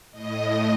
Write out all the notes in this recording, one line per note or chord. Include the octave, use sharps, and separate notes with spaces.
A2 D#5